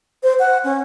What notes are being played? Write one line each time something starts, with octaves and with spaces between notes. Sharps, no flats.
C5
F#5
C#4